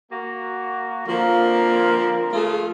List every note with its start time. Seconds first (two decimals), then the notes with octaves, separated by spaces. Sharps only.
0.12 A#3 F#4
1.07 D3 F3 A#3 C4 A#4
2.33 A3 F4 G#4